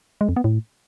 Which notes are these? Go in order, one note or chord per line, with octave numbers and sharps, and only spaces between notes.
G#3
F2
B3
A2